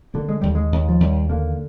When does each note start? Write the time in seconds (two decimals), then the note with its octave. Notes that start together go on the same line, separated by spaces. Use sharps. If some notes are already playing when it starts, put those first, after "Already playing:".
0.14 D3 A#3
0.29 G#3
0.42 D#2 G3
0.55 G#3
0.72 D#2
0.89 F3
1.00 D#2 G3
1.30 D3 A#3